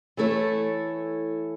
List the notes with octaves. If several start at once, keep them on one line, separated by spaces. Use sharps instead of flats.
E3 A3 E4 A4 C#5